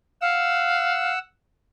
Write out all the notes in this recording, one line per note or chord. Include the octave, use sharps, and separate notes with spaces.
F5 F#5 E6